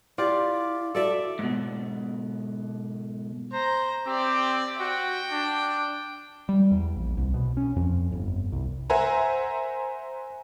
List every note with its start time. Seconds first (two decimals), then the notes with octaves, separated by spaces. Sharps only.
0.18 E4 F4 G4 D5
0.95 F#4 A4 D5 E5
1.39 G#2 B2
3.53 C5 A#5
4.07 C4 G4 D5
4.80 F#4 G5
5.32 D4
6.49 G3
6.71 E2
6.96 A#1
7.17 C2
7.34 B2
7.57 C#4
7.76 F2
8.12 G1
8.52 C2
8.90 A#4 C5 E5 F#5 G#5 A#5